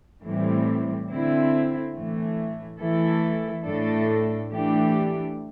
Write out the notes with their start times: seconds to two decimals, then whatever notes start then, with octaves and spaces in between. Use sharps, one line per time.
0.24 A2 E3 G3 C4
1.09 D3 C4 E4
1.95 A2 E3 A3
2.80 E3 A3 E4 A4
3.65 A2 A3 D4 A4
4.51 E3 A3 D4 G4